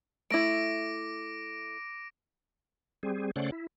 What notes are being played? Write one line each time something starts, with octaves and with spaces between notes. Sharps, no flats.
A3 E4 D6 A#6 D7
G3 C4 G#4
C#3 A3 C#4 C5 D5 F#5
E4